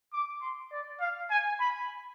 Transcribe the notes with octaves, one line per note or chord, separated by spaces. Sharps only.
D6
C6
D5
F5
G#5
B5